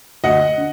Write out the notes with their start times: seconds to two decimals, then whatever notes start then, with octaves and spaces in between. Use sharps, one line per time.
0.24 D2 D#5 F#5
0.57 D3